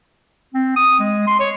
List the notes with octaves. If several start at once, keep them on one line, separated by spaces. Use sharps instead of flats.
C4
D#6
G#3
C6
C#5